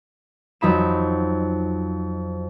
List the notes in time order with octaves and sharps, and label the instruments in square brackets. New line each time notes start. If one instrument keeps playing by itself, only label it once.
[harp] F2 F#3 D#4 B5 E7